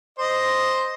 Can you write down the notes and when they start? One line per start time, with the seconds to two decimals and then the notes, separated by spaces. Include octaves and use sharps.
0.19 C5 D#5